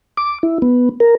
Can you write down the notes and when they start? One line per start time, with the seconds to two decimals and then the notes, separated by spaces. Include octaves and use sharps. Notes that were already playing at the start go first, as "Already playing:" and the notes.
0.17 D6
0.43 E4
0.62 B3
1.00 A#4